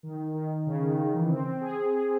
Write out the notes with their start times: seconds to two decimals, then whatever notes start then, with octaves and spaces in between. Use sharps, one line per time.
0.03 D#3
0.34 D#3
0.66 C#3
0.82 D#3
0.98 D#3
1.14 E3
1.29 C4
1.46 C4
1.61 G#4
1.76 G#4
1.93 G#4